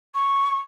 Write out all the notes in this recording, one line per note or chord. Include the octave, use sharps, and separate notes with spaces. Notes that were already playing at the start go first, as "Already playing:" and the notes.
C#6